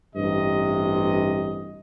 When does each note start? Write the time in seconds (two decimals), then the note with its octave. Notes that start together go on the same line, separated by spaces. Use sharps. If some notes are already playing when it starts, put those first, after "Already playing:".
0.15 A1 G2 C3 D#5